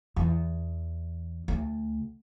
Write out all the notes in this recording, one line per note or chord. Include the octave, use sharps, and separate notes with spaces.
E2
D2